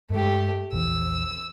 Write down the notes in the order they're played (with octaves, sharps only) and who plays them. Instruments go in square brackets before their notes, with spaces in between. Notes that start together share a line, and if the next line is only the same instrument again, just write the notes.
[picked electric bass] G2 G#3 [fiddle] A3 G4
[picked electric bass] A#1 E2 E3 [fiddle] E6